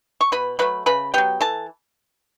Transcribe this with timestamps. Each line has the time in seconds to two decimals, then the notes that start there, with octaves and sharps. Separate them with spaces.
0.21 C#6
0.32 B2 B4 B5
0.59 F#3 A3 B4 B5
0.86 C#3 B4 B5
1.14 F#3 B3 G4 G5
1.41 E3 A4 A5